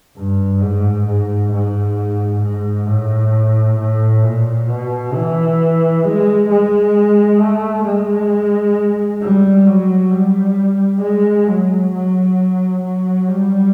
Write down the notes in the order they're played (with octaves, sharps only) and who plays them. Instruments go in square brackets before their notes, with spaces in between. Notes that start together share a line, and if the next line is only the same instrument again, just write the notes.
[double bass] G2
G#2
G#2
G#2
G#2
A2
A2
A#2
B2
E3
G#3
G#3
A3
G#3
G3
F#3
G3
G#3
F#3
F#3
F#3
G3